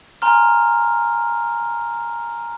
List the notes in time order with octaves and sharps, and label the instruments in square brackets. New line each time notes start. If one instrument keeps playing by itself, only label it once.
[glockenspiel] G#5 A#5 C6 F6